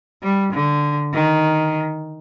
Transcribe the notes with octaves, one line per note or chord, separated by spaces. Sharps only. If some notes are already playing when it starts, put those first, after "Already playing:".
G3
D3
D#3